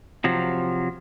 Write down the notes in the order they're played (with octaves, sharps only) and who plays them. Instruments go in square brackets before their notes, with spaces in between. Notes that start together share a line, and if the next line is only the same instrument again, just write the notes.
[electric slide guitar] C3 F3 F#3